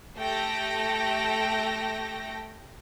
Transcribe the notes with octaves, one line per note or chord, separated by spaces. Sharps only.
A3 G4 A4 G5 A#6